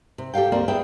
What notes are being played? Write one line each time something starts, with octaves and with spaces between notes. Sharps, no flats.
C3
G4 A4 C5 F5 G5
D2 A#3 C4 D5
B3 G#4 E5 F#5 G5